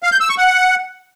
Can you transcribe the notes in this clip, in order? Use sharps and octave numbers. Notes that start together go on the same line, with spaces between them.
F5
G6
E6
C#6
F#5